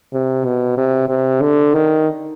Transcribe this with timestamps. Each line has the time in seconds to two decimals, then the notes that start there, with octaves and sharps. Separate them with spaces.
0.13 C3
0.45 B2
0.78 C3
1.09 C3
1.42 D3
1.74 D#3